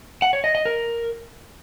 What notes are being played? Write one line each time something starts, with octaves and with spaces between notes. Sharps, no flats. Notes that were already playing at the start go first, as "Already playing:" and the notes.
F#5
C#5
D#5
D#5
A#4